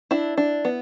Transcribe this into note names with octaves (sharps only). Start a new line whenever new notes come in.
D4 E4
D4
B3